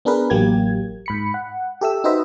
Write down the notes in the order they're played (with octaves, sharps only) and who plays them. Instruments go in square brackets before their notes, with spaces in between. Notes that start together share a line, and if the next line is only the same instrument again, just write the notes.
[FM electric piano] B3 D4 G#4 A#4 B4
A1 F#3 A#3 G4 G#6
G#2 B5 C#7
F#5
G4 A4 E5 E6
D#4 F#4 B4 C5 D#5 E5